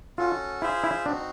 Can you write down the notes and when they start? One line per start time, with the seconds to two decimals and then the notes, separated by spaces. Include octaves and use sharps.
0.18 C#4 F4 F#4 A4
0.62 E4 F4 G#4 C5 E5
0.84 E4
1.05 C4 D4 D#4 F#4